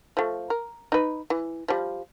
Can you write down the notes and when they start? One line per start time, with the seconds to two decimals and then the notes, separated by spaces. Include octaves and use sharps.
0.17 F3 A3
0.50 A#4
0.92 D#4 B4
1.30 E3
1.68 F3 G3